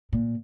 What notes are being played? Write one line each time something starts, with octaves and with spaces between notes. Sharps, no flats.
A#2